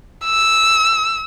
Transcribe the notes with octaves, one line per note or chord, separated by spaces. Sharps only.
E6